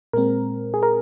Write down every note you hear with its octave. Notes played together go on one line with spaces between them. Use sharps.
A#2 G#3 C4 A#4
G#4
A#4